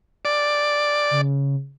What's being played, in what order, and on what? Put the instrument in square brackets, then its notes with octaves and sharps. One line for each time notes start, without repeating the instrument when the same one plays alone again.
[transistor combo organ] D5
[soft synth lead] C#3